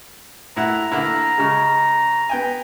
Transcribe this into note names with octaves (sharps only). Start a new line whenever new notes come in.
A2 E4 F#5 A#5
D3 A#3 E4
C#3 G#3
B3 G5 G#5